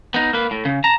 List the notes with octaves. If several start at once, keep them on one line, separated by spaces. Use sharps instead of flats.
B3 D#4
A#3 B4
A2
C#3
A5 A#5